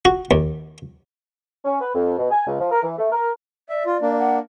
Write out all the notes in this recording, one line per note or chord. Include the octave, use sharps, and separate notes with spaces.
F#4
D#2
C#4
B4
F2
B2
G#5
C#2
F3
A#4
E3
A3
A#4
D5 E5
F4
A#3 D4
F#5